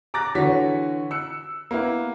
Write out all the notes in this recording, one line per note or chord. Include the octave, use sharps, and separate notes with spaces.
A#5 D6 F#6 A6 A#6
D3 E3 F#4 C#5 B6
E6 F#6 C#7
A#3 B3 E4